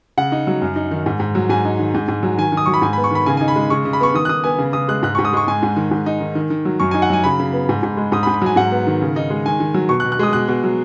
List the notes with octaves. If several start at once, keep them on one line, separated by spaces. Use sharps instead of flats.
C#3 F#5
D#4
F#3
F#2
D#4
D#3
G#2
G#2
F#3
G#2 G#5
D#4
D#3
G#2
G#2
F#3
D#3 G#5
D#3
D#6
F#3 C#6
B5
G#2 G#5
B3 B5
C#6
D#3 B5
C#3 G#5
D#4 G#5
B5
G#3
C#3 C#6
C#3
B5
B3 C#6
D#3 D#6
F#6
D#3 D#6
B3 G#5
C#3
C#3 D#6
G#3 F#6
G#2 F#6
G#2 C#6
D#6
G#3 C#6
G#2 G#5
G#2
D#3
G#2
D#4
D#3
D#3
D#3
F#3
F#2 C#6
D#4 G#5
F#5
F#3 G#5
C#3 B5
C#3
B3
G#2
G#2
G#3
G#2 D#6
B5
G#2
B5
F#3 G#5
G#2 F#5
B3
D#3
C#3
D#4
G#3
D#3 G#5
D#3
F#3
B2 C#6
F#6
B2
F#6
G#3 D#6
B2 F#6
B2
F#3